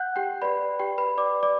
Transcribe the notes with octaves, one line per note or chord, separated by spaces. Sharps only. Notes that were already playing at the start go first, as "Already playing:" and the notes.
Already playing: F#5 F#6 G6
G4 G5
G4 B4 D5 B5
G4 G5
B4 B5
D5 D6
D5 D6